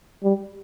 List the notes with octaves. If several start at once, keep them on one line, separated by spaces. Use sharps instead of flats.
G3